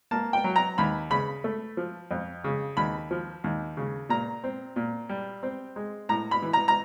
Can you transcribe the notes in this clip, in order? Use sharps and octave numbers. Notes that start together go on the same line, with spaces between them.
A#3 A5
G5
F#3
A#5
D#2 B5
C#3 B5
A3
F3
F2
C#3
D#2 B5
F3
D#2
C#3
A#2 A#5
C4
A#2
G3
C4
G#3
A2 A#5
B5
E3
A#5
A#5